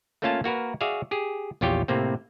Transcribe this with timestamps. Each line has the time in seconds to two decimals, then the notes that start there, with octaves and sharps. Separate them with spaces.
0.22 A3 A#3 C#4 F4 F5 A5
0.44 A#3 F#4 A#4 B4
0.81 F#4 G#4 D5 E5 F5
1.11 G4 G#4
1.61 A#1 E2 F4 G4 C#5 G5
1.88 A2 C3 A#3 C4